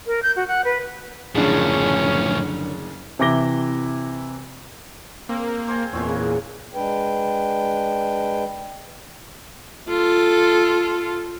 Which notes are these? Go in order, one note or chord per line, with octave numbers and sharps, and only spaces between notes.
A#4
G6
F#4
F#5
B4
F#1 F#2 A2 D3 F3 C#4 D4 G#4
C3 E3 E4 D6 A#6 G7
A#3 C4
C5 G#5
E2 A#2 G#3 C4 C#5
C#3
G#3 D4 B4 G5
F4 A4